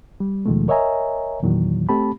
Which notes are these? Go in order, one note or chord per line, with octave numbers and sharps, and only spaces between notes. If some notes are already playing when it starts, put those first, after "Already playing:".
G3
D#2 B2 D#3 F3 G#3 A3
A#4 C#5 D#5 E5 G#5 A#5
E2 A#2 D#3 E3 F#3
A3 C4 G4 A5 B5